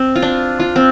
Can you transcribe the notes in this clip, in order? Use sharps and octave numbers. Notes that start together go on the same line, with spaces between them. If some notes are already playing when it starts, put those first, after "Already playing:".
Already playing: C4
F4
D4
F4
C4